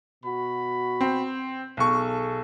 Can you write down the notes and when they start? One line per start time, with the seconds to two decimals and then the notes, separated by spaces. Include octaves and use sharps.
0.24 B2 F#4 B5
1.01 C4
1.77 B1 G#4 A4 C#6